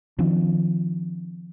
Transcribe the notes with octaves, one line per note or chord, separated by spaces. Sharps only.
D#3 F3 C4 D4